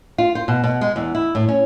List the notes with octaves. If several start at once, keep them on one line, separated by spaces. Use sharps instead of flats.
F4
C5
B2
B2
G#3
E2
E4
A2
C#4